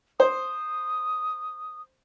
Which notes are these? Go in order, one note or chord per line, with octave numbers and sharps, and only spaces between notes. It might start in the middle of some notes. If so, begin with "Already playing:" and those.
C5 D#6